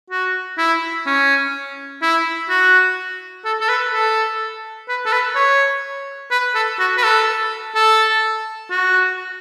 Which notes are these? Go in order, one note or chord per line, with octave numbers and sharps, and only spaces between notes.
F#4
E4
C#4
E4
F#4
A4
A4
B4
A4
B4
A4
B4
C#5
B4
A4
F#4
B4
A4
A4
F#4